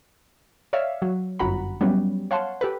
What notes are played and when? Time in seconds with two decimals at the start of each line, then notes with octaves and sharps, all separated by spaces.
0.73 C#5 D5 E5 F5
1.02 F#3
1.39 G1 F#2 F#4 F#5 A#5 B5
1.81 F#3 G3 B3 C#4
2.31 C#5 F5 F#5 A5 C6
2.61 G4 A4 B4